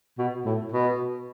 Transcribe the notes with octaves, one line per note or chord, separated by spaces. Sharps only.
B2
A2
B2